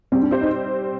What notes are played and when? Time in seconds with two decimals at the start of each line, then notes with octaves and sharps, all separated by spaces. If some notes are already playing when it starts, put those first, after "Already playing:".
0.12 G3 C4
0.22 D4
0.31 C4 G4 C5
0.41 D#4